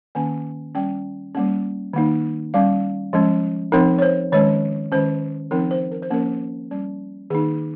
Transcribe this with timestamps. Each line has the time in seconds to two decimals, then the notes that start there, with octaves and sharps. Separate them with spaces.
0.15 D#3 A#3 C#4 G#5
0.75 G3 C#4 G5
1.35 G3 A#3 C#4
1.93 D#3 A#3 D#4
2.54 G3 C#4 F5
3.13 F3 G#3 C#4
3.72 F3 C4 D#4 A#4
3.99 C#5
4.02 C5
4.32 D#3 G#3 C#4 C#5
4.92 D#3 G#3 C#4 C5
5.51 F3 C4 D#4 A#4
5.71 C5
5.91 A#4
6.02 C5
6.10 F3 A#3 C#4 A#4
6.71 G3 C#4
7.30 D#3 A#3 D#4 G#4